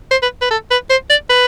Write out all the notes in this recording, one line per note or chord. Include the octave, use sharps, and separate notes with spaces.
C5
B4
B4
A4
B4
C5
D5
B4